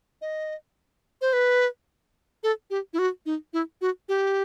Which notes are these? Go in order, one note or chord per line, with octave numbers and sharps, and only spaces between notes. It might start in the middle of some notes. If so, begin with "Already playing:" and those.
D#5
C5
B4
A4
G4
E4
F#4
D#4
E4
F#4
G4